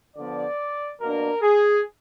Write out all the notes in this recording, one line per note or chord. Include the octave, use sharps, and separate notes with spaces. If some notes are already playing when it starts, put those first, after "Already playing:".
D3 F3 B3 D5
B2 A#3 D4 A#4
G#4